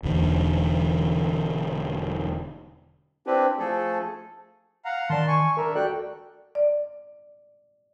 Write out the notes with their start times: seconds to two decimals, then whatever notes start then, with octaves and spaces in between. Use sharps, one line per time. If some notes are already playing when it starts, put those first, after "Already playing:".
0.03 E1 E2 D3
3.26 C4 D4 E4 G4 B4
3.59 F3 A3 G#4 A4
4.85 F5 F#5 A#5
5.10 D#3 D5 A5 C6
5.28 G#5 C#6
5.57 D4 A#4 E5 A#5
5.75 F#4 A4 D5 G5 F#6
6.55 D5